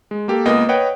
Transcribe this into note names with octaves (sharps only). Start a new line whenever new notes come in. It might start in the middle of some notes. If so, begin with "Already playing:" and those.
G#3
A#3 G4 A4
C#2 A#3 B3 D#5
B4 C#5 D#5 F#5 G5